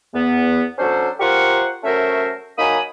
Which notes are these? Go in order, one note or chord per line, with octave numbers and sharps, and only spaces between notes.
E2 B3
F#3 C#4 D4 A4 C5
F4 G4 A#4 C5 F#5 C#6
F#3 A3 C#4 A#4 C5 E5
F#3 A#3 D#4 G#5 B5 D#6